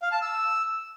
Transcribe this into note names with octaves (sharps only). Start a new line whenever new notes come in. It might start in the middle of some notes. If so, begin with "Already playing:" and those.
F5
A5
E6